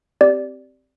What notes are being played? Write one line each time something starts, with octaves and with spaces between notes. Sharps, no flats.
C4 G4 D5